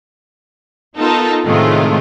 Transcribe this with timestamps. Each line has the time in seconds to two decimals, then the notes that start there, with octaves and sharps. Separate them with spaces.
0.97 B3 D#4 F4 A4 A#4
1.46 A2 C3 D#3 G#3 A3 F4